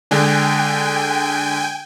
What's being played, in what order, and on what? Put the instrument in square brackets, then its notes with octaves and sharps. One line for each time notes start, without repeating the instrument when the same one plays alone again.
[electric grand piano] D3 G#3 D4 [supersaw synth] G5 G#5